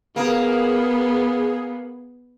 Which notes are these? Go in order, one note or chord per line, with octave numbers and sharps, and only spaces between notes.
A#3 B3 G#4 A#4